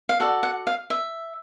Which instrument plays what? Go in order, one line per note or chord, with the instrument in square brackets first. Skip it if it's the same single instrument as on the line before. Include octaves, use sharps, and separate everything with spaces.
[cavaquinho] F5
F#4 A4 D5 F#5
F#5
F5
E5